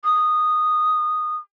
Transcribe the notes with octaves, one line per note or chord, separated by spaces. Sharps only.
D#6